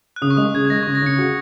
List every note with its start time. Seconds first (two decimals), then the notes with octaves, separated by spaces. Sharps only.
0.16 F#6
0.22 C#3 D#6
0.30 C#6
0.37 G#3 D#6
0.54 C#3 G#6
0.65 G#6
0.70 G#3 A#6
0.83 C#3 C#6
0.95 A#6
1.02 C#3 C#7
1.18 F#4